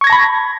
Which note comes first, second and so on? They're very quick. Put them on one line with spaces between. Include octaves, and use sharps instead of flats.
C#6 G#6 A#6 A5 B5